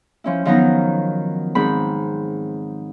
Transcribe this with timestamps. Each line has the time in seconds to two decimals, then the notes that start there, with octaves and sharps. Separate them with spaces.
0.24 F3 C#4 E4
0.45 D#3 F3 F#3 B3 D#4 A#5
1.55 G#2 D#3 C4 B5